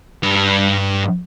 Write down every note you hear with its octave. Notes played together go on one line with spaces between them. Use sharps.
G2